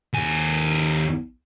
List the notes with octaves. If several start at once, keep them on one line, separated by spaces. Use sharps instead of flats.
D#2 G#5